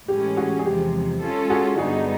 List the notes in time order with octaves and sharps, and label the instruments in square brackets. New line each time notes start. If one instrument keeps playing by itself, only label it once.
[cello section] A2 E3 G#3 C#4 [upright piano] G4
[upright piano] F#4 G#4
G#4
[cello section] E2 C3 F3 G#3 [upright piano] G4
[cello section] G#3 C#4 F4 A4
[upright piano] F#4 G#4
[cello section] G2 D3 G3 B3 D#4 [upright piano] F#4 G#4